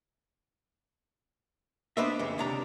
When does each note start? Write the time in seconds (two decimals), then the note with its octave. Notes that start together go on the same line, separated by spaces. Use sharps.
1.97 B3 D4 B4 C5 D#5 E5
2.19 F2 C#3
2.38 C#2 C3 D4 G4 A#5